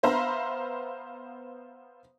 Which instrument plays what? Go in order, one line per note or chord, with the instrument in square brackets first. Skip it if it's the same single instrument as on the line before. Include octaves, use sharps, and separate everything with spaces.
[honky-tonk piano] B3 C5 E5 F5 A#5 B5